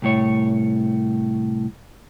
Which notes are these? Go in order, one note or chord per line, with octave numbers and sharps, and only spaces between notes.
C2 A2 C#5